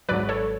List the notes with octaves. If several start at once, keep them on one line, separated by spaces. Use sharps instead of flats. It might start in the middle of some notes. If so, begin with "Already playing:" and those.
G#1 G#2 F#3 B4 D5
A4 C#5